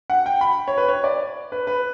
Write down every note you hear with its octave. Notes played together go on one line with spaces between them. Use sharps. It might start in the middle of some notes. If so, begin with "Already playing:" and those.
F#5
G5
B5
C#5
B4
C#5
D5
B4
B4